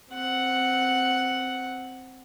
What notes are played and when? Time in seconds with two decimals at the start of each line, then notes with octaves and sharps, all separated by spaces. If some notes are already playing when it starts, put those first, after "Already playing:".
0.11 C4 F#5